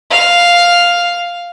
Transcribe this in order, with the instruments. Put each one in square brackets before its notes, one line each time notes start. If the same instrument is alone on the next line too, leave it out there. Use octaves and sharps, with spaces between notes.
[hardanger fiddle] F5